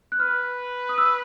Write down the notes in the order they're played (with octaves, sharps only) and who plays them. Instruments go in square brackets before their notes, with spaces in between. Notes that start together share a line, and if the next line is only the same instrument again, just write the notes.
[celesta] F#6
[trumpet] B4 [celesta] F6
[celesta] D#6
E6